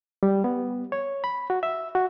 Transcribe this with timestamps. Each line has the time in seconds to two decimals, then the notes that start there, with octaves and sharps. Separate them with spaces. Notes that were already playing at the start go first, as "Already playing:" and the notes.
0.23 G3
0.44 B3
0.92 C#5
1.24 B5
1.50 F#4
1.63 E5
1.95 F#4